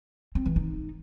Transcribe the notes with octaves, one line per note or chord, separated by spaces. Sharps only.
C4
E3
D#4